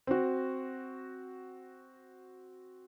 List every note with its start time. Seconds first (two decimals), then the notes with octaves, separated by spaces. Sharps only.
0.07 C4 F#4